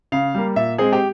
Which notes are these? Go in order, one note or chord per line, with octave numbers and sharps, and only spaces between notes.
C#3 F5
G3 A#3
A#2 E5
G#3 C4 G#4
G4